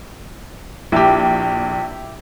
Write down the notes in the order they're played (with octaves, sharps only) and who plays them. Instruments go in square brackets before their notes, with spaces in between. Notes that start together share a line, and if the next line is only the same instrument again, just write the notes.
[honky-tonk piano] A#1 [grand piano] E4 G4